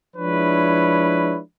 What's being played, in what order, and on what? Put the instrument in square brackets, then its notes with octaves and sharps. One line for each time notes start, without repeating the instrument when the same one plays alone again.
[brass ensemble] F3 G#3 D4 E4 B4 C#5